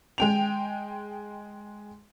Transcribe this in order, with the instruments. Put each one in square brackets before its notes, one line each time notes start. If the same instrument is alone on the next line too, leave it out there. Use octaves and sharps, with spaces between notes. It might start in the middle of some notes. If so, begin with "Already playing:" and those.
[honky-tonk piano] G#3 G5 F7